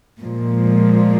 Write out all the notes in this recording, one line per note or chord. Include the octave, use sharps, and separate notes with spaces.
A#2 F3 G#3